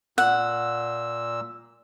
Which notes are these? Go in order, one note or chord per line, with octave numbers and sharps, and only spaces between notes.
A#2 F#5 E6